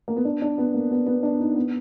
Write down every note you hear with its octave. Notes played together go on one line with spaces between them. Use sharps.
A#3
B3
D4
D4
B3
A#3
B3
B3
D4
D#4
B3